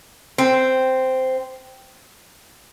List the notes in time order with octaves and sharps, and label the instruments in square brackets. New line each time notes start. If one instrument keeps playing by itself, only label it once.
[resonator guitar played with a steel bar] C4